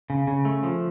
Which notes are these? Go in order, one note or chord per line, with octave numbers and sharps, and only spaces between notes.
C#3
C#3
A3
F3